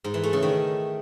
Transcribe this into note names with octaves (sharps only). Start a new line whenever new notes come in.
G#2
E3
A3
C#3
D#3